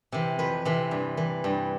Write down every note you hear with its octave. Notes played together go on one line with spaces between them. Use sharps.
C3 E3
F2 B4
C3 E3
G2
E3
G2